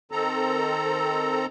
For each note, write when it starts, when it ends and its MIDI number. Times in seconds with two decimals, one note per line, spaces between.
0.12 1.46 51
0.12 1.46 60
0.12 1.46 69
0.12 1.46 82